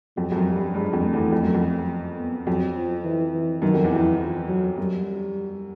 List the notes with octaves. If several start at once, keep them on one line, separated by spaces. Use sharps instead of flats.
F2 F#3
F2
F#2
G3
G2
G2 G#3
F2
A3
E2
F2
F#2
F2
B3
F2 F#3
F3
E3
E3
F#2 D#3
F2
E2
F2 E3
F3
F#3
F#2 G3